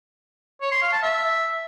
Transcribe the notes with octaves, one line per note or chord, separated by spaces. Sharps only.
C#5
C6
F5
A5
E5